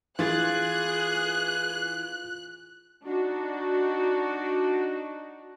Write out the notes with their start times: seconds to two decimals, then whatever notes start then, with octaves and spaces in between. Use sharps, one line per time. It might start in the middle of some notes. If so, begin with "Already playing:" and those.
0.19 E3 F4 G#4 F#6 A6
3.03 D4 D#4 F#4